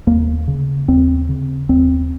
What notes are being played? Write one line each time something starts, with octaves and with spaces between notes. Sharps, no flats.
D#2 A#3
C#3
D#2 C4
C#3
D#2 C4